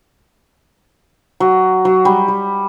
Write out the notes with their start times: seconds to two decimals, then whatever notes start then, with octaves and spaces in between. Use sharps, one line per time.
1.40 F#3
1.85 F#3
2.05 G3
2.28 G3